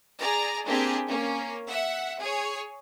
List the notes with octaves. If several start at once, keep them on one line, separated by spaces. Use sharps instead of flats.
G#4 D5 A#5
A#3 C4 D4 G4 G#4
A#3 C#4
E5 F#5
G#4 C#5